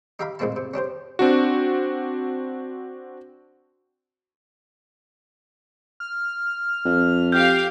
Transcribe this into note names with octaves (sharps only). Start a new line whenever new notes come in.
D#4 G4 E5 F5 A#5 B5
A1 A#2 G#3 C4 E4 A5
C3
C#4 D4 G4 C5
C4 D4 F#4
F6
F2
G4 F5 F6 G6